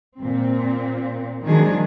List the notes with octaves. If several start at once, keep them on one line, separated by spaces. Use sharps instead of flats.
A#2 C4
D#3 F3 F#3 G#3 D4 G#4